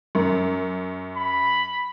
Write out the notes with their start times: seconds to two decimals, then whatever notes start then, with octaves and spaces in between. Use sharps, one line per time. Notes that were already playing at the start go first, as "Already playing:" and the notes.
0.15 F#2
1.16 B5